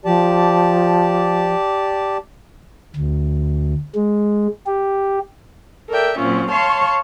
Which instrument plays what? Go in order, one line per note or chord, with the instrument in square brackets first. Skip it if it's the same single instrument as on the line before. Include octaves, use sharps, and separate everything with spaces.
[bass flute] F3 [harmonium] G4 D5 A5
[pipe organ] D2
G#3
G4
[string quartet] A4 A#4 D5 E5 G5
A#2 F#3 C4 C#4 F4
C#5 F5 A5 C6 C#6